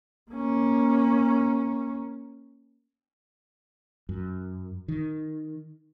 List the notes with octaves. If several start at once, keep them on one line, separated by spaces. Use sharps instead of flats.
A#3 C#4
F#2
D#3